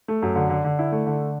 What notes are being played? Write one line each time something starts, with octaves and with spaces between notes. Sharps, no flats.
A3
F#2
D3
D3
D3
E4
A3
D3